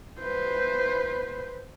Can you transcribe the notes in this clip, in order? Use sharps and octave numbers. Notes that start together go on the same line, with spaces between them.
B4 C5